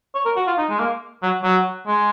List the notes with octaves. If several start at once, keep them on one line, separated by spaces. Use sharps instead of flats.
C#5
A#4
F#4
F4
D#4
G#3
A#3
F#3
F#3
G#3